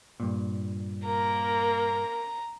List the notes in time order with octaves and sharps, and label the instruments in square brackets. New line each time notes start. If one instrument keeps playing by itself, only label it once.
[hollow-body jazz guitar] G2 A#2
[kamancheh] A#3 A#4 [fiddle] A#5